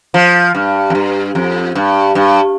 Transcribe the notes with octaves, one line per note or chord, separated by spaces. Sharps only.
F3
G2
F2
G2
F2
G2
G2